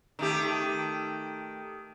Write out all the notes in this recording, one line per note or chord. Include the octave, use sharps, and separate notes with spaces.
D#3 A3 G4